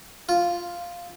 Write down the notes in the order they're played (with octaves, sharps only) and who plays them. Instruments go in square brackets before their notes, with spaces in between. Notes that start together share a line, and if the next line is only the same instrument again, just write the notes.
[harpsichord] F4